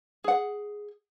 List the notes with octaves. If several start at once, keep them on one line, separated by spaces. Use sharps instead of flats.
G#4 F#5